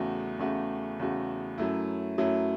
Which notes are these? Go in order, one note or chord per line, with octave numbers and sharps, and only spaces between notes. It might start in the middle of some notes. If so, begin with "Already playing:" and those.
Already playing: E2 C#3 A3 F#4
E2 C#3 A3 F#4
E2 C#3 A3 F#4
F#2 F#3 A3 E4
F#2 F#3 A3 E4